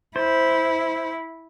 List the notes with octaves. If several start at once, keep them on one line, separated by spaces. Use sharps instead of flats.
E4 C5